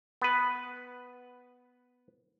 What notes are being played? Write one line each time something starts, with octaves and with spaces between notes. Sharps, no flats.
B3 B4